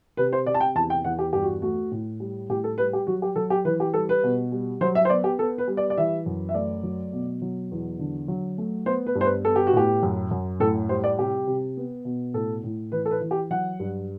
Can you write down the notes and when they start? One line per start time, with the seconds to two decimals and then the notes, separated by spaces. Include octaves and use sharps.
0.17 C3 B4
0.33 C5
0.46 C3 D5
0.54 A5
0.61 G5
0.75 E2 A5
0.90 G5
1.04 E2 F#5
1.19 G4
1.33 G2 G4
1.43 F#4
1.62 A3 F#4
1.91 A2
2.20 G3
2.49 A2 G4
2.64 A4
2.78 G3 B4
2.93 G4
3.07 F#3 F#4
3.22 G4
3.36 F#3 A4
3.50 G4
3.65 E3 B4
3.80 G4
3.94 G3 A4
4.09 B4
4.23 B2
4.52 G3
4.81 F#3 C5
4.95 E5
5.05 C5
5.09 B3 D5
5.24 G4
5.39 B3 A4
5.58 B4
5.68 G3
5.77 D5
5.90 D5
5.98 E3 E5
6.26 F#2
6.49 E5
6.54 A3 D5
6.83 F#3
7.13 B2
7.42 F#3
7.71 E2
7.99 D3
8.28 F#3
8.58 A3
8.86 B3 C5
9.07 B4
9.15 G2
9.21 C5
9.25 B4
9.45 B3 A4
9.56 G4
9.67 F#4
9.73 A2 G4
10.03 F#2
10.31 F#2
10.60 A2 A4
10.89 G3 C5
11.04 D5
11.18 C3 G4
11.47 C3
11.77 B3
12.05 B2
12.34 A2 A4
12.64 A2
12.92 E3 B4
13.06 A4
13.11 B4
13.21 E3
13.31 G4
13.51 F#3 F#5
13.80 G2